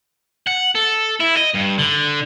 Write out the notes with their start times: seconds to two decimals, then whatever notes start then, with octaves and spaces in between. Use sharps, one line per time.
0.47 F#5
0.75 A4
1.20 E4
1.36 D#5
1.54 G2
1.78 D3